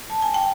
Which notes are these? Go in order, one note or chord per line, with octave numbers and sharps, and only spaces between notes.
A5
G#5
G5